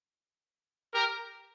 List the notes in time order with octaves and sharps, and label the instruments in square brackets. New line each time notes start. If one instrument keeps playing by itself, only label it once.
[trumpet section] G4 A#4